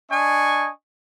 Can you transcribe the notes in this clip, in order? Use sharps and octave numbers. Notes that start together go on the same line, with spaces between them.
D4 D#5 G#5 C#6